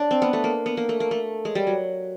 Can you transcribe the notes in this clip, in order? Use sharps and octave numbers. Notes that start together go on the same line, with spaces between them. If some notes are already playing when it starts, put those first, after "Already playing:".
Already playing: D4
C4
B3
A3
A#3
B3
A#3
A3
A#3
A3
G#3
G3
F#3